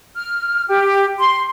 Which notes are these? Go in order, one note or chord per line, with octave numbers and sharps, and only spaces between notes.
F6
G4
C6